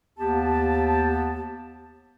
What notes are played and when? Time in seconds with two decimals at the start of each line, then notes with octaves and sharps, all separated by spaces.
0.18 D#2 B3 G4 A5